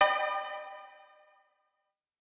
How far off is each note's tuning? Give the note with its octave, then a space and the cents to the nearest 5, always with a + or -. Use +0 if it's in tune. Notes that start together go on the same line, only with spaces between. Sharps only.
D#5 -45 G5 +0 B5 +0